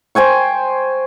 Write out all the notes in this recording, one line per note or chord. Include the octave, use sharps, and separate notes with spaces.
C5 G5 G#5 C#6